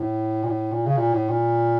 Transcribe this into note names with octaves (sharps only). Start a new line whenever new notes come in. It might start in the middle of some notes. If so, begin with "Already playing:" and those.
Already playing: A2
A#2
A2
A#2
C#3
A#2
A2
A#2